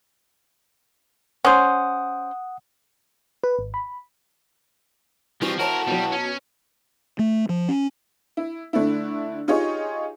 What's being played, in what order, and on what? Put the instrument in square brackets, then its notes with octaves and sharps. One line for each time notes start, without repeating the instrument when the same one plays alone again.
[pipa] C#4 C5 [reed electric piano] F#5 D#6
[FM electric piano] B4
G#1
B5
[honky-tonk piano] E3 [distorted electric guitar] F3 [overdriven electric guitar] G3 C4 [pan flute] F#4
[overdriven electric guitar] E4 F#4 [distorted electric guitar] A#4 [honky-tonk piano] C5 C#5 [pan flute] A5
[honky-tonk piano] B2 F#3 [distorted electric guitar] G3
[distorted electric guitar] C#4
[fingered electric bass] A3
F3
C#4
[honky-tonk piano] E4
D3 A3 D4 E4
D#4 F4 G4 G#4 C#5 D#5